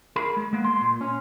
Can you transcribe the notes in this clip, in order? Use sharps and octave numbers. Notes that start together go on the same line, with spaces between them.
G#4 A#4 B5
G#3
G#3 A#3 B3
C6
A#2
C#4